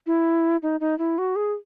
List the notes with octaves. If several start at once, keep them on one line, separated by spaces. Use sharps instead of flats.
E4
D#4
D#4
E4
F#4
G#4